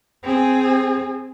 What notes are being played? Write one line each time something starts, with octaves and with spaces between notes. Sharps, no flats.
C4 G#4